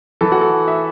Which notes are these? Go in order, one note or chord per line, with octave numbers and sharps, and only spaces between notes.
E3 A4
F#4
A4
E5